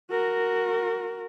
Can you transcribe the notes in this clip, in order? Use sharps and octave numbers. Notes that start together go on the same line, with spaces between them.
F#4 A#4